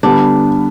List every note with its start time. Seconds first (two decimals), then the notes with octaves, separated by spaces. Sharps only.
0.03 D3 G3 B3 D4